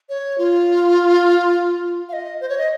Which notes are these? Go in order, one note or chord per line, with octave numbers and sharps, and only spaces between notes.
C#5
F4
F5
D#5
C5
C#5
D#5